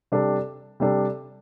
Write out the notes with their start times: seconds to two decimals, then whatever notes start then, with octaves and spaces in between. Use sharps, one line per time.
0.12 C3 G3 D4 A4
0.80 C3 G3 D4 A4